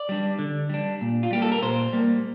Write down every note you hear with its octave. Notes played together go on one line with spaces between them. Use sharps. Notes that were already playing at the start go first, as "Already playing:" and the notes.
Already playing: D5
G3 D4
D3
G3 D4
A#2
F4
G3 A#3 G4
A4
A#4
A#2 C5
G3 A#3